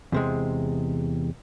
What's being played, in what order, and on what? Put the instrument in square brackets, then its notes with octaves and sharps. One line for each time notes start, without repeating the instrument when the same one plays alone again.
[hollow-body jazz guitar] E2 C3 G#3